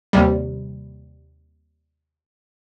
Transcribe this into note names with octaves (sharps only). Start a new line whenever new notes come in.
D#2 C3 G3